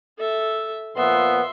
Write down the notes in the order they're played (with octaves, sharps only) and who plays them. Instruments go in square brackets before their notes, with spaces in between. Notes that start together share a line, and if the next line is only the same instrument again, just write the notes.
[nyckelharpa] A4 E5
[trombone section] A#2 F3 B3 [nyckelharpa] E5 C6